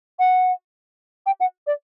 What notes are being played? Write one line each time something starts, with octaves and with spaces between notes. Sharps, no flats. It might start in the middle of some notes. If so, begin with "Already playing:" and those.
F#5
G5
F#5
D5